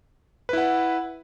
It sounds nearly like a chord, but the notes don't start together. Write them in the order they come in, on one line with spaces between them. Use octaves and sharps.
B4 E4 F#5